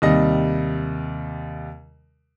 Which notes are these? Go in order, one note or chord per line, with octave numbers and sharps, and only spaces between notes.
D#2 C3 G3 D#5 A#6